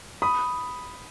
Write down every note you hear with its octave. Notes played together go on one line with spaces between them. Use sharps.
B5 D#6